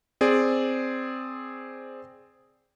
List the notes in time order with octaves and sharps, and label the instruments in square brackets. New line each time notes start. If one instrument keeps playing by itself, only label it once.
[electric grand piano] C4 G#4 D5